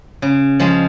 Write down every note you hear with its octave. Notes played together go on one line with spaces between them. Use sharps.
C#3
F3 G#3 C#4 G#4